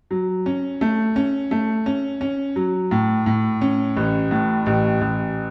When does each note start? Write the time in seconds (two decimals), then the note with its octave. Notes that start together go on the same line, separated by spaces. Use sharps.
0.11 F#3
0.46 C#4
0.81 A3
1.16 C#4
1.51 A3
1.86 C#4
2.21 C#4
2.56 F#3
2.91 A2
3.26 A2
3.61 C#4
3.97 A1
4.31 A2
4.66 A1
5.01 A1